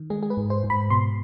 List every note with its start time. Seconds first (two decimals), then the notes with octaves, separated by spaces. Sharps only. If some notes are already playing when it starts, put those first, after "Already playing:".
Already playing: D#3
0.10 G#3 G#4
0.23 G#4
0.30 B4
0.37 G#2
0.50 C5
0.64 G#2
0.70 B5
0.90 B2 C6